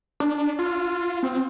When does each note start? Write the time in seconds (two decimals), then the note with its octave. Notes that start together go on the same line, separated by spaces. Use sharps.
0.20 D4
0.59 F4
1.23 C4